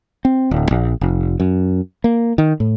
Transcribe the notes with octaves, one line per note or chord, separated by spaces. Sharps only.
C4
D1
A#1
F1
F#2
A#3
D#3
A2